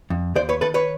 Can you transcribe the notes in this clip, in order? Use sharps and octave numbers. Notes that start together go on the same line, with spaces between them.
F2
D#2 C5 D5
B4 C#5
D#3 A4 B4
B4 C#5